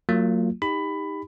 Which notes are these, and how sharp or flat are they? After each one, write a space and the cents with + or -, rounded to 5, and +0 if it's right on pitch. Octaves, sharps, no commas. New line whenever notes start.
F#3 +0 A#3 -35 F4 +0
D#4 +15 G4 +25 B5 +15